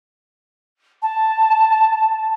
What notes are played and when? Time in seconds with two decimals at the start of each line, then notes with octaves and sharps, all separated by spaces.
1.02 A5